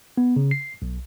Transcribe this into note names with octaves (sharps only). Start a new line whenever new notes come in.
B3
C#3
C7
B1